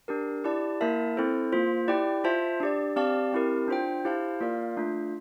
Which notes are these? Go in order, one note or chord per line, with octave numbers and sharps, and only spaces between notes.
D4 G4 A#4
E4 G4 D5 A5
A#3 E4 A#4 E5 A5
C4 E4 A4 C5
A#3 F4 C5
E4 G4 D5 G5
F4 C5 E5 A5
D4 G4 D5
C4 G4 D5 F5 A5
C4 E4 G4 A#4
D4 F4 C5 G5
E4 G4 C5 F5 A5
A#3 F4 A#4 D5 F5
A3 D4 F4